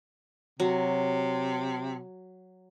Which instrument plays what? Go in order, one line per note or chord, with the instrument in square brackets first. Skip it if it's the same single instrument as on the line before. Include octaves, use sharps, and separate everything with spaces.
[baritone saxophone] C3 [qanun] F#3